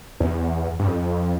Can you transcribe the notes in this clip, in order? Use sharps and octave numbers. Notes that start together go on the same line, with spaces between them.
E2
G2
F2